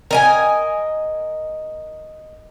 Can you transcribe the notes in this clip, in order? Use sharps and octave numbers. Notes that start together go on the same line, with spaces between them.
A#4 D#5 G#5